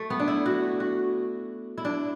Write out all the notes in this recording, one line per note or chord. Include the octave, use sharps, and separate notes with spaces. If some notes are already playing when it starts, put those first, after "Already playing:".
Already playing: A3
B3
D4
E4
F#4
F#4
E4
D4